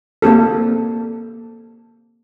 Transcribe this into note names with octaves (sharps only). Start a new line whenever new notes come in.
A#3 C4 G4 A4